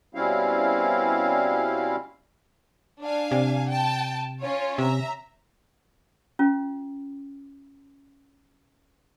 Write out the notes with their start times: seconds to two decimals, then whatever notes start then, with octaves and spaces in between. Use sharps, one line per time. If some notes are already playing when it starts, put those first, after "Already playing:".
0.15 B2 G3 C4 C#4 E4 F5
3.01 D4 F5 G#5
3.31 C3
3.69 G5 A5
4.40 C#4 F4 C#5
4.78 C3 E5 A#5
6.39 C#4 F4